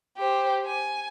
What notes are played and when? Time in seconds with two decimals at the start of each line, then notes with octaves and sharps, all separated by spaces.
0.17 G4 C5
0.66 G#5